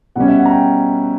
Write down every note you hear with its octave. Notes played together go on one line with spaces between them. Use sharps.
B2 G3 C#4 F#5
E5
F#5
A#5
G5